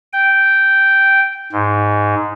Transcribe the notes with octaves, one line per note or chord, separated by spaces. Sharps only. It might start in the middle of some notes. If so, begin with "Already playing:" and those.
G5
G#2